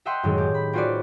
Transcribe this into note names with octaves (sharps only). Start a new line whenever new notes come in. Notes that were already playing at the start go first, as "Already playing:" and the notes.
D#5 E5 F#5 G5 A#5 C6
F#2 A2 D#3 G#3
G4
B5
C4 C#4 F4 F#4 B4 D5